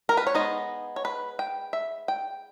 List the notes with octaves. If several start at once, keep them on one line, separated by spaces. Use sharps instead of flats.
A#4
B4
C#5
G#3 B3 D#4 D#5
C#5
B4
G5
E5
G5